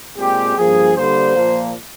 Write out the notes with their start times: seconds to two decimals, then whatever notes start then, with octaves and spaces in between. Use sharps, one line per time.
0.17 A#2 G#3 C4 G4
0.57 G2 F3 A#3 G#4
0.96 D3 G3 A#3 C5
1.35 A#2 F3 A#3